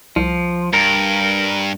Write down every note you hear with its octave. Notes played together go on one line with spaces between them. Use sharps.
C2 F3
G2 A#4